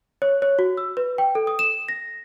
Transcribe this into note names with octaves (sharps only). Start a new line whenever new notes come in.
C#5
C#5
F#4
E6
B4
G5
A4
D#6
E7
A#6